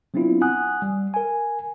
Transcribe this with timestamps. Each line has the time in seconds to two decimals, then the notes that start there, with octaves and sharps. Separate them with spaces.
0.14 F#3 B3 C4 D4 E4 F4
0.42 F#5 G#5 D#6 F#6
0.82 G3
1.14 A#4 G#5